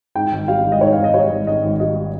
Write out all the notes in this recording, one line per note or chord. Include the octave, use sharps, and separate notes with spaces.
G#2 G5
G#1
G3 F5
G#1
D#5
G#2 C#5
F5
G#1
D#5
G3 C#5
G#1
G#2 D#5
G#1
G3 D#5